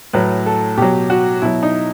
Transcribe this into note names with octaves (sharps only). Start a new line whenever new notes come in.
A2 F#3 B4
A4
B2 F#3 G4
F#4
B2 F#3 E4
D#4